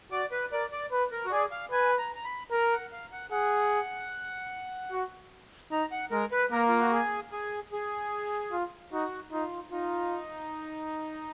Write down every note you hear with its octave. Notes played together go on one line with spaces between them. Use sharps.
F#4 D5
B4
A#4 D5
D5
B4
A#4
F#4
G#4 D5
F5
B4 G#5
A#5
A#5
B5
A#4 A#5
F#5
F5
F#5
G#4 F#5
F#4
D#4 A#5
F#5
G#3 A#4
B4
A#3 A#4
F4
F#4
G#4
G#4
G#4
F4
D#4 F#4
D#4 F4
D#4 F4